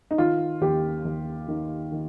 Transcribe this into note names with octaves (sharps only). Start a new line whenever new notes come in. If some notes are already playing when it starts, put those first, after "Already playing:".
D#4
D#3 F4
D#2 G4
D#2
D#3
D#3